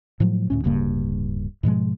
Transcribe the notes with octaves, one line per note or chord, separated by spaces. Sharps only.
A2 F3 F#3
D2 A2 C#4
D1 G2 C#3 A#3
G#2 B2 F3 G#3